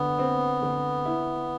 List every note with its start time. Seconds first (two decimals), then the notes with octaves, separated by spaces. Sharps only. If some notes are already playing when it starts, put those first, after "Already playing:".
Already playing: D3 B3
0.19 C4
0.62 D3
1.05 E4